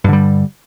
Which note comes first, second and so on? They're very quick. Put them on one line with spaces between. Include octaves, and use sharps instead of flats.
G2 D3 G3